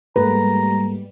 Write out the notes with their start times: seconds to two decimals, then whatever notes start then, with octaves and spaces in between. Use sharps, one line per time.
0.16 G#2 G3 A3 A#3 B4 A#5